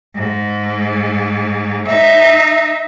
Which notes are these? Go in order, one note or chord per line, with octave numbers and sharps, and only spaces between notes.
G#2
D#4 E5